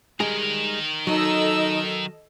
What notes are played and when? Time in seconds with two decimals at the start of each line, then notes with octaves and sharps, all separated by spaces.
0.20 D#3 G3 G#3 G#4 A#4
1.07 F#3 D#4 A4 D#5 E6